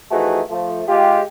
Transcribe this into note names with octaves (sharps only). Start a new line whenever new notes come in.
E3 F3 A3 D#4 F#4 G#4
F3 A3
G#3 F4 G4